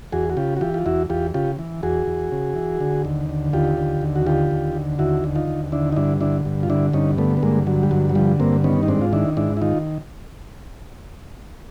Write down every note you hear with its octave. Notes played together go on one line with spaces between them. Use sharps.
E2 F#4 G#4
F#4
C#3 F4 G4
F#4
E3 F4 G4
F4
E2 E4 F#4
E2 F4 G4
C#3 F4 G4
E3
E2 F#4 G#4
E2
C#3
E3
D3
D#2
D3
D#2 F4 G4
D3
D#2
F#4
D3 F4 G4
D#2
D3
D#2 E4 F#4
D3
D#4 F4
D#2
D3 D4 E4
D#4
G2 D4 E4
D3 D4 E4
G2
F4
D3 D4 E4
G2 C#4 D#4
D3 A3 B3
B3
G2 G#3 A#3
D3 F#3
G3
G2 F#3
F#3
D3 F3 G3
G2 A#3 C4
D#3 B3 C#4
D#4
G#2 C4 D4
F4
D#3 D4 E4
G#2 D4 E4
E4
D#3 D#4 F4